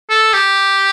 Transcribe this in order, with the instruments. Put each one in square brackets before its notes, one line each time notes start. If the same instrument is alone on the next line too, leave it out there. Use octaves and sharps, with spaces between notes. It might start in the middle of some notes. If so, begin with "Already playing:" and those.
[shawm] A4
G4